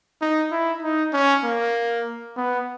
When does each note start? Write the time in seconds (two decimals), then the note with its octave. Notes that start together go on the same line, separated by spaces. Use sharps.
0.21 D#4
0.51 E4
0.82 D#4
1.13 C#4
1.44 A#3
2.37 B3